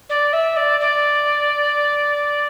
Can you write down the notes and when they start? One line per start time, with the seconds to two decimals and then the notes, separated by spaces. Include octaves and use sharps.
0.09 D5
0.32 E5
0.56 D5
0.80 D5